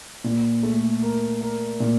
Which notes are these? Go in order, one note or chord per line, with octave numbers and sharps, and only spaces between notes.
A#2
A3
A#4
A#4
A#2